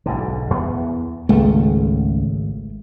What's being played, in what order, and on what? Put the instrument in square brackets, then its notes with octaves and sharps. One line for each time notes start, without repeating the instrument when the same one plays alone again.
[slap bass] B1 G#2 D3
E2 B3
[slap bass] G#1 [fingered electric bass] C#2 [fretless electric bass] G#3 A3